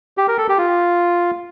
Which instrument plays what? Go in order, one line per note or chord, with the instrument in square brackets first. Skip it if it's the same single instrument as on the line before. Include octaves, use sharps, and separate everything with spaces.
[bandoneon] G4
A#4
A4
G4
F4